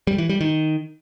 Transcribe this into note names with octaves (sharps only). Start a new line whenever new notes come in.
G3
E3
G3
D#3